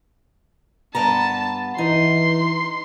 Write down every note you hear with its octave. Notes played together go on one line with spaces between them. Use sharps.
G2 B3 A5 A#5
E3 D#4 C6